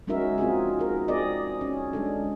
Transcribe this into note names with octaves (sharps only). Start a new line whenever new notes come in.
G#3 C#4 D#4 F#4 A#4 E5
C4 F4 F#4 G#4
G#4 A#4
C4 G#4 A#4 D5 D#5
C#4
G#3 D4 A4